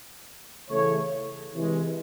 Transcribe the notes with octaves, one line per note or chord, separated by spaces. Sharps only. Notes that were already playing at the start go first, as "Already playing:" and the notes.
C#3 E3 A3 C#5
C3 E3 G#3